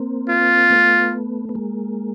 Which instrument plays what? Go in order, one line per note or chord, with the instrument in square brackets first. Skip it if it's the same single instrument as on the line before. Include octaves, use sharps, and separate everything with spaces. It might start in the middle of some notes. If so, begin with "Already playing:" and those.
Already playing: [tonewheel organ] A#3 C4
[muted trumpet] F4
[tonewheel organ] A3 B3
B3
G#3 A#3